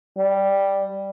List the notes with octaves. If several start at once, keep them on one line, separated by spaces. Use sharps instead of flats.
G3